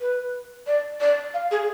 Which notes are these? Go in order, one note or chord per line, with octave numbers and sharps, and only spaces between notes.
B4
D5
D5
F5
G#4